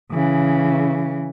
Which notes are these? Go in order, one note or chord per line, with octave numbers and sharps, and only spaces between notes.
C#3 E3